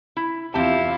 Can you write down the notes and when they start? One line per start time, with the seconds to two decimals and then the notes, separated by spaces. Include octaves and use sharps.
0.16 E4
0.54 E2 C4 E4 F4 G4 F5 A5